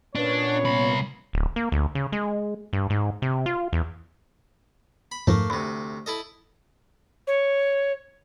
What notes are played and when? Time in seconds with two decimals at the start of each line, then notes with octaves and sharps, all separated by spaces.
0.15 A#2 B3 C#4 D4 C#5
0.65 C2 B5
1.33 D1
1.56 A#3
1.72 D2
1.95 C#3
2.12 G#3
2.73 G2
2.90 G#2
3.22 C3
3.46 F4
3.73 E2
5.12 B5
5.27 F2 G#2 F3 A3 A#3
5.50 D2 C3 B5
6.06 E4 A4 D#5
7.27 C#5